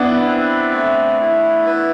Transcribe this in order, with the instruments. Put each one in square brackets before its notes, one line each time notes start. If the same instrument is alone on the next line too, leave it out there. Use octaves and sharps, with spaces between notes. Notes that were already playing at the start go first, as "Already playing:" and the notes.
Already playing: [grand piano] B3 D4 [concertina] E4 B4
[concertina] C4
A3
E4
B4